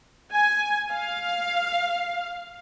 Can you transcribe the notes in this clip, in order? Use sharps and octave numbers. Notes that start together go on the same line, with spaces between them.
G#5
F5